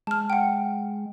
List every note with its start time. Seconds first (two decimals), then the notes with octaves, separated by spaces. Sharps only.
0.07 G#3 A5 F6
0.30 F#5 G5